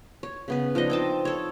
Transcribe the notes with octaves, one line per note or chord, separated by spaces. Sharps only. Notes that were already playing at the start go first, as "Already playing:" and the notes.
C#5
C#3 B3 B4
F3 D4 D#4 D#5
C4 G5 A5
A4 C#5